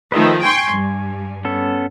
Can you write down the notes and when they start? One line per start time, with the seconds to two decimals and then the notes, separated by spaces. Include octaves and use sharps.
0.12 D#3 F3 A3 B4 D#5 E5
0.43 G5 G#5 C6 C#6
0.72 G2
1.45 B3 C#4 A4